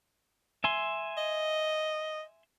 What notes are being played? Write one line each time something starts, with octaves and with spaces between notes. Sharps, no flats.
E5 G#5 C6
D#5